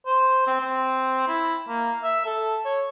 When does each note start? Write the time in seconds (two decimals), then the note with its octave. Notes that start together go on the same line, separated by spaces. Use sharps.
0.06 C5
0.47 C4
0.61 C4
1.28 E4
1.68 A#3
2.03 E5
2.26 A4
2.65 C#5